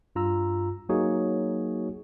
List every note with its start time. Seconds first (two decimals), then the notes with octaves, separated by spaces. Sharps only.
0.16 G2 F4 A#5 E6
0.89 F#3 A#3 D#4 F#4 G#4 C#5